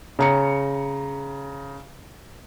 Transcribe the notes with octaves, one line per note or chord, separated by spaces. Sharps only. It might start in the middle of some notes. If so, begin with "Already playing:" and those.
C#3 A#5 C#7